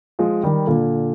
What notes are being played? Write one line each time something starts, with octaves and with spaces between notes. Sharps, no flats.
F3 G#3
D#3 G3
A#2 D3